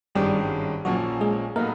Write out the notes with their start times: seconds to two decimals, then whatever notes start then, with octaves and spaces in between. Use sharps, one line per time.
0.15 G#1 G2 D#3 G3 G#3 C#4 G4
0.85 A#1 A#2 F3 F#3 A#3 C#4 F#4
1.21 G#3 G#4
1.56 A2 F#3 A#3 B3 D#4 A#4